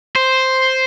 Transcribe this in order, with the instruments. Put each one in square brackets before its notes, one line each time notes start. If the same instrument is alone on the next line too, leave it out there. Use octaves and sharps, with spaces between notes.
[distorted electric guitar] C5